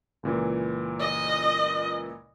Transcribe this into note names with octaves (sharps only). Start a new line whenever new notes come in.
C#2 A#2 E3
D#5